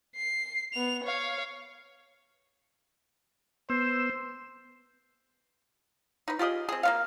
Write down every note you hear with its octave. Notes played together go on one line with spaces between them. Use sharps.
C7
B3 F7
C#5 F5
B3 C5 E6
D#4 B4
F4 G4 G#4 D#5
C4 G#4
A#3 B3 F5